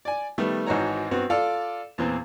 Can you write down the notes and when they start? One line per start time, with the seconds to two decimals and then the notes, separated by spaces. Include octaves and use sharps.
0.05 D5 G#5
0.38 D#3 G3 A3 B3
0.66 G#1 G#2 E3 F#4 C#5 A#5
1.11 G2 B3 C4 F#4
1.30 F4 A4 D5 F5
1.98 E2 A#2 E3 C4